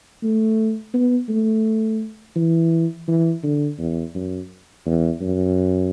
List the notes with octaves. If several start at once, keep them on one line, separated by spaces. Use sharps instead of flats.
A3
B3
A3
E3
E3
D3
E2
F#2
E2
F#2